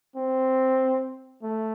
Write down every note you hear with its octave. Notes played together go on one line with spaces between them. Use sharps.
C4
A3